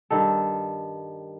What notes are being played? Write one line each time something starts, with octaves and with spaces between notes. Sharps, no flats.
G2 D#3 A4